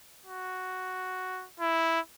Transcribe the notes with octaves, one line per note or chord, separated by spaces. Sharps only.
F#4
E4